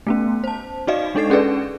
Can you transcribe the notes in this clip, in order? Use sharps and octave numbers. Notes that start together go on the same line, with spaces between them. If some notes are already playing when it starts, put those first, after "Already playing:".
A3 B3 C#4
C5 A5
D#4 F#4 D5 D#5 F5
G#3 D4 D#4 A4 A6 C7
C#4 G#4 A4 B4 D5